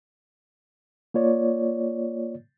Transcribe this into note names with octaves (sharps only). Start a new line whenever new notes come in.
A#3 F4 C#5 D5